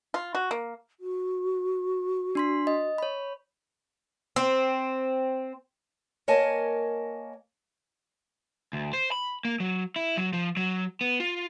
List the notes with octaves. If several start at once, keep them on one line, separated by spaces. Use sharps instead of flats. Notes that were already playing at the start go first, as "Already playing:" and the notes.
F4
F#4
A#3
F#4
D4 C6 B6
D#5
C#5 B5
C4
A#3 A#4 C#5 D#5 G#5 A5
D2
C5
B5
A#3
F#3
E4
F#3
F3
F#3
B3
F4